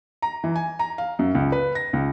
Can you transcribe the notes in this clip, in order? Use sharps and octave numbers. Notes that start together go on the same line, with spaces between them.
A#5
E3
G#5
A#5
F5
F#2
C#2
B4
A#6
C#2